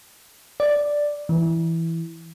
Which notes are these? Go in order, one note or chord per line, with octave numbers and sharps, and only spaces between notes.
D5
E3